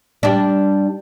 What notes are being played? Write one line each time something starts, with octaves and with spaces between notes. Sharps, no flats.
G3 D4